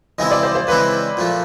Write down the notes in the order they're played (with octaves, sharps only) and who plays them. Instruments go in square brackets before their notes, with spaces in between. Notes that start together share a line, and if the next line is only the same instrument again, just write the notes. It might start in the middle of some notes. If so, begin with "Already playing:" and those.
[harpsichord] C#3 E3 G#3 C4 E4 [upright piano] D#5
[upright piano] D5
C5
C5
[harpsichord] C#3 E3 G#3 C4 E4 [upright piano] B4
[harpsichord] A#2 F3 A3